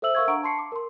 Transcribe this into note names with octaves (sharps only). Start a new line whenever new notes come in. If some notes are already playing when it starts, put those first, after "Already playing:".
A4 C5 E5 E6 F#7
A#4 E5 F5 C#6 E6 G#6
D4 F#5 A#5 C#6 D7
A5 C6 C7 C#7
D6
A#4 C6